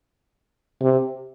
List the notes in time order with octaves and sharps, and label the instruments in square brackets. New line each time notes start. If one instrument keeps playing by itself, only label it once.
[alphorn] C3